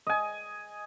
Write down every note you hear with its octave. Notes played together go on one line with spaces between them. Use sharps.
D#5 G#5